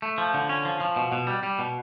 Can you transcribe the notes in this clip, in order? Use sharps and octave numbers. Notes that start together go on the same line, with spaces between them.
A3
F3
D3
C#4
F3
F3
B2
B2
G3
G3
B2